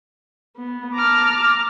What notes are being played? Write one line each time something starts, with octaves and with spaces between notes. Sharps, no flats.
B3
A5 A#5 D6 F6